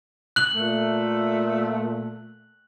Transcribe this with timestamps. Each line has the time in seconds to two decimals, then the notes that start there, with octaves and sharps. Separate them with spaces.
0.36 F#6 F#7
0.54 A#2 A3